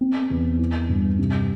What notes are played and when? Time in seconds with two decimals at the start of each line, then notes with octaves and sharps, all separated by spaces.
0.01 C4
0.30 E2
0.59 E3
0.89 G2
1.19 C3